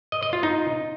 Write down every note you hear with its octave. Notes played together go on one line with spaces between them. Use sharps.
D#5
D#5
F4
D#4